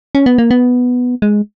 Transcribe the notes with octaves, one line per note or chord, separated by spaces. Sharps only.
C#4
B3
A#3
B3
G#3